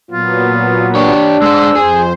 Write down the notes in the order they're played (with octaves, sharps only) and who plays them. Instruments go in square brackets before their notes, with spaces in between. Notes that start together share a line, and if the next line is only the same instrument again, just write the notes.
[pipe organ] A#2 F#3 B3 [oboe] F4
[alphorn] D4 [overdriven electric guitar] G4 C#5
[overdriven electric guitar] G#3 C5 [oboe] E6
[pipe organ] F2 C5 [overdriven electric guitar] G#4